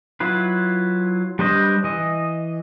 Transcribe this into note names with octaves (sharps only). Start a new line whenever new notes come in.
F#3 E4 F4 B4
G3 D4 B4 C5 D#5
E3 D#5